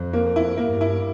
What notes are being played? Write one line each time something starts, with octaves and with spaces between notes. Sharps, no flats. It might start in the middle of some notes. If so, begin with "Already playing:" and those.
Already playing: F2
A#3
E4
G2 A#3
E4